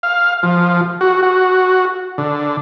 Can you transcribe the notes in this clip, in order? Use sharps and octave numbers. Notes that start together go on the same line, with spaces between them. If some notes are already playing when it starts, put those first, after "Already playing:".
F5
F3
F#4
F#4
D3